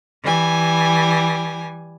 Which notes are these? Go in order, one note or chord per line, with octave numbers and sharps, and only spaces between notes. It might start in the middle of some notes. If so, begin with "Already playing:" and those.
E3 G3 G#5